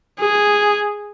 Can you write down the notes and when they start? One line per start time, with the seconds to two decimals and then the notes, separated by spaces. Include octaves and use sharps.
0.20 G#4